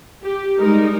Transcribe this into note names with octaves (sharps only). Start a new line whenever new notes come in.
G4
G3 G#3 D#4 A#4